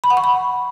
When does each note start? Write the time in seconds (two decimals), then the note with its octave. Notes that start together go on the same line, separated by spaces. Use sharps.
0.04 B5
0.10 F#5
0.17 C#6
0.24 B5